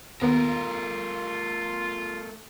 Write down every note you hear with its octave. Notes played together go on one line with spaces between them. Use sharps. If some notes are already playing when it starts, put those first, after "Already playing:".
D#2 A3 B3 F4 A#4